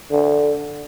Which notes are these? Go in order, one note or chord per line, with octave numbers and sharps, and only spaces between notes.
D3